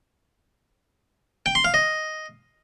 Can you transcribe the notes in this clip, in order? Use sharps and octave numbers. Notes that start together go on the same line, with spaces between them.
G5
C6
F5
D#5